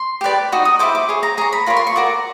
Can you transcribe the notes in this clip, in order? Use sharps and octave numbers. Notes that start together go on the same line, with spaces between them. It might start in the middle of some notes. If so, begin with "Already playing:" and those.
Already playing: C6
G4 B4 D5
D#4 F#4
D#6
E4 A4 C5 D6
D6
G#4 C#5
A#5
G#4 C#5 A#5
B5
F4 A#4 C#5 B5
C6
C#6
F#4 A#4 D5 D6